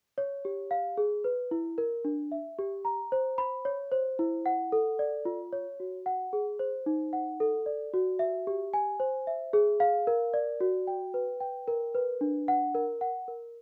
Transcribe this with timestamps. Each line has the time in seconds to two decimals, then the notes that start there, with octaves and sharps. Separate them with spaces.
0.18 C#5
0.45 G4
0.71 F5
0.97 G#4
1.24 B4
1.51 E4
1.78 A#4
2.05 D4
2.32 E5
2.59 G4
2.85 A#5
3.12 C5
3.38 B5
3.65 C#5
3.92 C5
4.19 E4
4.46 F#5
4.72 A4
4.99 D5
5.25 F4
5.53 C#5
5.80 F#4
6.06 F#5
6.33 G#4
6.59 C5
6.86 D#4
7.13 F#5
7.40 A4
7.66 D5
7.94 F#4
8.19 E5
8.47 G4
8.73 G#5
9.00 C5
9.27 E5
9.53 G#4
9.80 F5
10.07 A#4
10.34 D5
10.60 F#4
10.87 G5
11.14 B4
11.41 G5
11.68 A#4
11.95 B4
12.21 D4
12.48 F#5
12.75 A#4
13.01 F#5
13.28 A#4